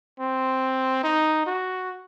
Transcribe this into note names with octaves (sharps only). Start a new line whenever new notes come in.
C4
D#4
F#4